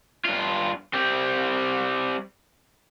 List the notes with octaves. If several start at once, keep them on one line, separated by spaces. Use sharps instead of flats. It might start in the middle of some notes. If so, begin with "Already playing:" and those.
G2 F4
G3 C4